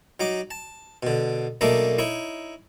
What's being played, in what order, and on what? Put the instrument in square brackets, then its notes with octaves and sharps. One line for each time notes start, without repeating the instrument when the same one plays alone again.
[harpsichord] F#3 D#4 D6
A5
B2 D3
B1 A3 A#3 D4 D#4 E5
D#4 E4 C#5